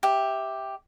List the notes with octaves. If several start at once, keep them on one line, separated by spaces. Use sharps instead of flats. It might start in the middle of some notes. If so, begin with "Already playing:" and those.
G4 E5